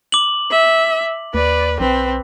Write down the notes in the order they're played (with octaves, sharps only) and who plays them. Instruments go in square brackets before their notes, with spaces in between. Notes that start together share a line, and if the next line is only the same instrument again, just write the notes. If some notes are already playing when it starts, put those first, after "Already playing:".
[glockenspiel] D6 F#7
[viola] E5
[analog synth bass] D#2 [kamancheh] B4 [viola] D5
[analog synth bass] B1 [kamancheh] C4 [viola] B4